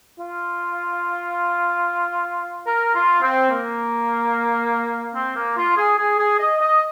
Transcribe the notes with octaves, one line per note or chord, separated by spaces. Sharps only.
F4
A#4
F4
C4
A#3
C4
A#3
F4
G#4
G#4
G#4
D#5
D#5